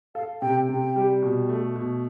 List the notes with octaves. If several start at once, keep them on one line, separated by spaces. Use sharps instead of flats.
A4 F5
C3 G5
C3 G5
G3
B2
A3
B2